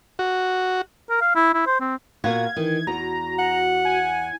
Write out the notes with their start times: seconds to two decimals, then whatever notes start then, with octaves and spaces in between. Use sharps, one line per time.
0.19 F#4
1.10 A#4
1.21 F5
1.35 E4
1.54 E4
1.66 C5
1.80 C4
2.24 A#2 B3 F#4 F5 G#6
2.56 D#3 E3
2.87 E2 F#4 A#5
3.39 F#5
3.85 G#5